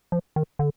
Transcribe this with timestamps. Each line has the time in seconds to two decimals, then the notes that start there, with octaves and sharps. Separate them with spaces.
0.12 F3
0.36 D#3
0.59 D3